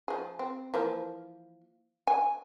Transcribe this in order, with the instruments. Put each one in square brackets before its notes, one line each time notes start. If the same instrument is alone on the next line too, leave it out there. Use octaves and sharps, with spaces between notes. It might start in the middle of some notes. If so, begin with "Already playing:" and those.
[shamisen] F3 G#4
C4
E3 F3 A#3
G#5